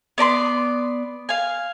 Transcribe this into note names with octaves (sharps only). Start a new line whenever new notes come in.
B3 D5 A#5 C6
F5 G#5